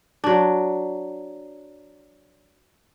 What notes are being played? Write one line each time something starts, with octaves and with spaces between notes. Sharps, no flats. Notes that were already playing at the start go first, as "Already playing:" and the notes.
F#3 D4